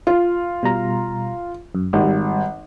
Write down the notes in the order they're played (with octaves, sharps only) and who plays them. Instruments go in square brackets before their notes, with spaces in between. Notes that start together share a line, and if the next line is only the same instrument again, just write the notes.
[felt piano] F4
[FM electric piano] B2 G3 A#5
F#2
[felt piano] G#1 [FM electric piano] G3